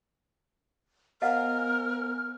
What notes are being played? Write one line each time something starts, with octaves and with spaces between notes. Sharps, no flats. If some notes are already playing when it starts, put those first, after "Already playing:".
B3 A#4 C5 D#5 F5 F#5 G#5 F6